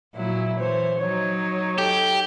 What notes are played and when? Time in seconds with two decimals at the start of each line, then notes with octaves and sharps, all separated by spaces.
0.15 A#2 F#3 E4
0.59 E3 C5 C#5
1.00 F#3 D#4 C#5
1.78 G4 A4